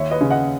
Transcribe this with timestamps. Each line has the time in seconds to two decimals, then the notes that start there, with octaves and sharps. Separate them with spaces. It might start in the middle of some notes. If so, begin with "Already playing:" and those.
Already playing: D#2 C#5 E5
0.11 B4 D#5
0.21 C#3
0.30 D#5 F#5